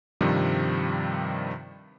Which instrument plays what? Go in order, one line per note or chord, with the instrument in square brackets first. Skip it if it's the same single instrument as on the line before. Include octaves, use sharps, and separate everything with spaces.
[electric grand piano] G2 C3 D#3 F3 G3